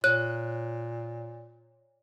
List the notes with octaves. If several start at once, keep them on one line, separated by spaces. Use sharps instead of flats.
A#2 C#5 F#6